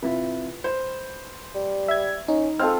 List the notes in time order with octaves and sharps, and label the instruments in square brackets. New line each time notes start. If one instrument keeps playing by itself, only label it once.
[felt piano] C3 E4 F4 [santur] B4
[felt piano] C5
[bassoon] G3
[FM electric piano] E5 G#6
[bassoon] C#4 [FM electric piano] D#4
[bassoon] G#3 [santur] C4 F4 A4 [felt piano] F6